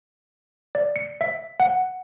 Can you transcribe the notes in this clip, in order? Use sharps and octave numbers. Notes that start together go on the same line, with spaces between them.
D5
C#7
E5
F#5